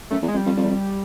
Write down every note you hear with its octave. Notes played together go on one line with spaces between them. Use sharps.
F#2 A3
E2
G#3
F2
G3
F2
F2
E2
F2